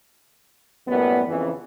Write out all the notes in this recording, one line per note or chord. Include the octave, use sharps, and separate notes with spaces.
F#2 A2 G3 A#3 B3
F2 C#3 E3